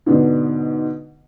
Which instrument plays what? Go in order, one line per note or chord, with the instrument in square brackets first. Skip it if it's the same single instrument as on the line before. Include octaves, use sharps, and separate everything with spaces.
[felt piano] G#2 B2 D3 B3 D4